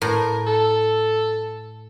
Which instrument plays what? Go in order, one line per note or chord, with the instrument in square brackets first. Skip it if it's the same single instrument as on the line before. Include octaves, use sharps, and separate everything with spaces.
[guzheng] A2 [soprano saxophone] A#4
[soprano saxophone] A4